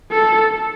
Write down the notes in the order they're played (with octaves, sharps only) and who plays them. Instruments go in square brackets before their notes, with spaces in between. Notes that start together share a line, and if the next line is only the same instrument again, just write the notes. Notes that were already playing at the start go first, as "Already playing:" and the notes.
[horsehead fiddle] A4